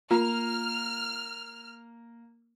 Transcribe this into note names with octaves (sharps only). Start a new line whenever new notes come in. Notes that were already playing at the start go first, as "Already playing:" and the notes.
A#3 F4 F6